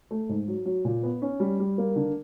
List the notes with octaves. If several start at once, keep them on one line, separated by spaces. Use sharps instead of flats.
A3
G#2
F#3
F#3
A#2
B3
C#4
G3
G3
A#3
D3